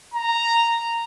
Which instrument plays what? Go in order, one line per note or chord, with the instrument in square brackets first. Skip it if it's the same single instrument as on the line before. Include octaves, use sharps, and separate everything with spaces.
[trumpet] A#5